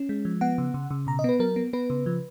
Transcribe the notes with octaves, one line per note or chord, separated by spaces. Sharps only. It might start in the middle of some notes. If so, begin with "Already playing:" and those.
Already playing: C#4
G#3
F3
B3 F#5
C#3
C#3
C#3
B2 A#5
D#5
B3 B4
F#3 A#4
B3
B3 B4
C#3
F3